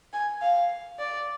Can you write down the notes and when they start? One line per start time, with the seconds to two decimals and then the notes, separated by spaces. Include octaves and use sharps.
0.13 G#5
0.42 F5
0.99 D5